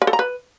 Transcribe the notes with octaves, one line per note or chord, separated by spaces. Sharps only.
A#4
A4
A#5
B4